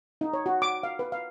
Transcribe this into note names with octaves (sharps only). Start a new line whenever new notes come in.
D#4
C#5
F#4
D6
F5
B4
F5